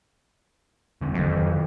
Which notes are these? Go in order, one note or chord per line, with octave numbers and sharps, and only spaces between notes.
E2 D3 C4
F2 D#3 E3 F#3